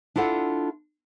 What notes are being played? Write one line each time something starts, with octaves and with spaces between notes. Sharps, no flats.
D4 E4 F4 A4 F#5